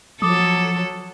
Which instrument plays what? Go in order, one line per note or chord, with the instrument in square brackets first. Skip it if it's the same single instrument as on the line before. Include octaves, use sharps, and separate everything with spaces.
[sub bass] F3 [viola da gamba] F#3 A4 [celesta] D6 D#6